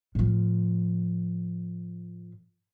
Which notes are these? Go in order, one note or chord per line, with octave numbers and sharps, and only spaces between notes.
A2 F3